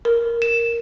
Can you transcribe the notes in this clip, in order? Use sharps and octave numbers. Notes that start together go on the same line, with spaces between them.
A#4
E7